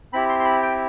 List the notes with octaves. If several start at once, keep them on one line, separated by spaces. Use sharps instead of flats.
C4 E4 G4 B5
C6
C6
B5
G5